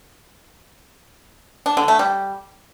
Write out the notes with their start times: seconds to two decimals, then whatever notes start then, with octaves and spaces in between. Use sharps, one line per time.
1.66 D4
1.77 D3
1.88 A3
1.99 G3